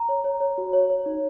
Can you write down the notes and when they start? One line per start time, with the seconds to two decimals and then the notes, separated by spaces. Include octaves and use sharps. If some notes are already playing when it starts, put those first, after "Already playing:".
Already playing: A#5
0.09 C#5
0.24 C#5
0.40 C#5
0.58 F#4
0.73 C#5
0.90 C#5
1.06 D#4